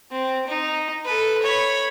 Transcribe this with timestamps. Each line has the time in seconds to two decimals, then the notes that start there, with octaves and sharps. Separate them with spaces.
0.12 C4
0.47 D#4
1.05 A4 B4
1.43 C#5 B5